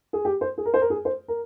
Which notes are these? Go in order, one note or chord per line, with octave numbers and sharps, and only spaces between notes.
G#4
G4
C5
G#4
A#4
C5
A#4
G#4
C5
A#4